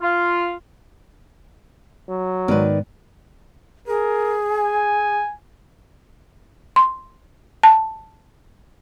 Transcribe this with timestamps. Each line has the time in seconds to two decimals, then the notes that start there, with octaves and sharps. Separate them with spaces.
0.01 F4
2.09 F#3
2.48 G#2 D#3 G#3 B3 B4 D5
3.88 G#4 A#4
4.51 G#5
6.76 C6
7.63 A5